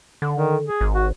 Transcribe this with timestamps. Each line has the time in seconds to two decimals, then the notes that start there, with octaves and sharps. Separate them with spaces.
0.22 D3
0.35 D#3
0.66 G#4
0.81 G#1
0.94 F#4